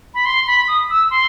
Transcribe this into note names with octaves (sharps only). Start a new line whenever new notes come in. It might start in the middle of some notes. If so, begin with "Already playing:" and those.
B5
C6
B5
D#6
E6
C6